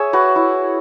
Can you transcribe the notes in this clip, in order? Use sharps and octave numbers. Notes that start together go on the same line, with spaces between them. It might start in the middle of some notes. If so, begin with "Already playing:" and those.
Already playing: G#4 C#5 E5
F#4 B4
E4